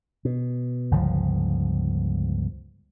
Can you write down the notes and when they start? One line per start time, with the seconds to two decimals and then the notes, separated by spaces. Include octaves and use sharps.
0.25 B2
0.91 G1 C#2 F3